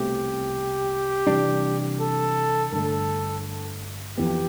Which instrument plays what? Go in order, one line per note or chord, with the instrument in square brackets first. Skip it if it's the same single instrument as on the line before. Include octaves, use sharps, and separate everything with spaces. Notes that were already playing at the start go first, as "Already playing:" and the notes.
Already playing: [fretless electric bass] C2 B2 A3 C4 [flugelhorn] G4
[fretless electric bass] C3 E3 G3 D4
[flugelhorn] A4
[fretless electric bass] G2 D3 A3 [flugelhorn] A4
[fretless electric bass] F2 E3 B3 [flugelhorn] G4